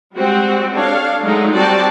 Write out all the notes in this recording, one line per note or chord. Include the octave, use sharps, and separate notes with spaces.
G3 G#3 C4 F#4
D4 A4 C#5 F5
F#3 G#3 A3 D#4
G3 C4 F#4 D5 G5 A5